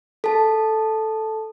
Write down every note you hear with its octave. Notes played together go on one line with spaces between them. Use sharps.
A4 A5